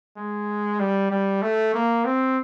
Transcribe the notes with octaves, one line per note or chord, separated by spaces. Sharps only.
G#3
G3
G3
A3
A#3
C4